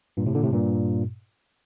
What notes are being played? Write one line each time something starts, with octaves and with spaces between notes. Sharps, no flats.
G2 A#2
A2 C3
A#2 D3
A2 C3
G2 A#2